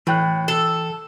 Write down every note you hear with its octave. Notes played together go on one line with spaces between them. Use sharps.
A2 E3 G5 F#6
A4